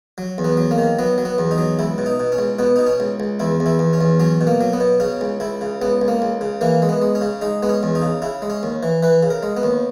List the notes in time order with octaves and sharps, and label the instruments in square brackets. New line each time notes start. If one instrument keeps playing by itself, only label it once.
[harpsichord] F#3
E2
B3
F#3
A#3
D#3
F#3 B3
F#3
B3
E2
D#4
F#3
C#2 E4
B2
D#4
B2
C#4
C#2
B2 B3
B2 D#4
C#4
C#2
C#2
E2 E4
E2
E4
E2
C#4
E2
F#3 C#4
B2
A#3
F#3
B3
B2
C#3 C#4
C#2
C#2 E4
C#3
C#2 B3
C#2
A#3
C#2
C#3
E3 A#3
G#3
B3
G#3
C#4
C#3
G#3 D#4
G#3 B3
C#4
E2
D#4
C#3
C#3 E4
G#3
C#4
D#2
E3
E3 B4
C#3
A#4
G#3
B3
D#2